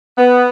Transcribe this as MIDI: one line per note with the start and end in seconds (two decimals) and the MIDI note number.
0.18 0.49 59